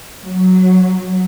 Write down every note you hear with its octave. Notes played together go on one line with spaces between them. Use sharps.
F#3